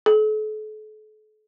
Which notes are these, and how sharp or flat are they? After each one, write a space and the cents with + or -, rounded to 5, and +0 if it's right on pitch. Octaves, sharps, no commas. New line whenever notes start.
A4 -40